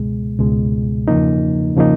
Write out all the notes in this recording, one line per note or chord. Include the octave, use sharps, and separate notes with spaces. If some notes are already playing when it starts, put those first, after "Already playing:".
Already playing: C#2 B2 G#3
C#2 B2 G#3
E2 C#3 F3 A#3 D#4
C#3 F3 A#3 D#4